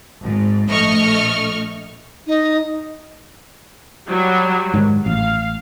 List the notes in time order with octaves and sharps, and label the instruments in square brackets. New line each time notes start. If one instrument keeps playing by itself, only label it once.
[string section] G#1 G#2
A#1 A3 D#5 C#6 F6
[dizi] D#4
[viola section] F#3 G3
[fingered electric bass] G#2 D#3
[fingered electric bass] A1 [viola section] F5